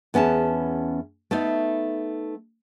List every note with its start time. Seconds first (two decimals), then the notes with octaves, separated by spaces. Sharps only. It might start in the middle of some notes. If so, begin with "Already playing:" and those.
0.14 E2 B3 C#4 G#4 A5
1.31 A3 B3 D#4